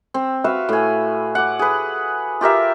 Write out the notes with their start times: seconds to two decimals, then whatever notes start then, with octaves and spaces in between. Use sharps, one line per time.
0.14 C4
0.44 F#4 B4 E5 F5
0.69 A2 G#5
1.35 F#5 D6
1.59 G#4 B4
2.41 F4 G4 A#4 E5